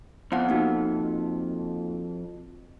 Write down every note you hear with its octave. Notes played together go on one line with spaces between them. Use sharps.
F2 B3 F5 F#5
A#3 D#4 F#4